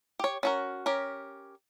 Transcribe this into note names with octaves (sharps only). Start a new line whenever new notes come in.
G4 C#5
C#4 F#4 A#4
C#4 G4 A#4